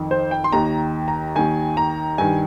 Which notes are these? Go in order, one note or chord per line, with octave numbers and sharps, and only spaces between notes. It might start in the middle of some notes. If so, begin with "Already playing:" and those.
Already playing: F2 D#3
C5
G5
C6
D#2 D#3 A#5
A#5
D#2 D#3 G#5
A#5
G2 D#3 G#5